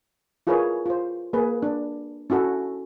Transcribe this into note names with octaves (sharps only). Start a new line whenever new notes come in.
E4 F4 G#4 A#4 B4 C#5
F4 C5
A#3 G#4 B4
D4
C#4 E4 F#4 A4